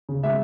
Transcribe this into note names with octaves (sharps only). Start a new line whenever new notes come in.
C#3
G#3 E5